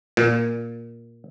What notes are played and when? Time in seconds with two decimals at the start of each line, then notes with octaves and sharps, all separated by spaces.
0.17 A#2